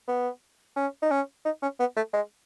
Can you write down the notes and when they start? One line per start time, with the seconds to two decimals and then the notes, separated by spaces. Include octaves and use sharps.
0.08 B3
0.76 C#4
1.02 D#4
1.11 C#4
1.45 D#4
1.62 C#4
1.80 B3
1.97 A3
2.14 G#3